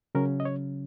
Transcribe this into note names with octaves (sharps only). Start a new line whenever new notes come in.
C#3 F#3 C#4 A#4
D#5
C#5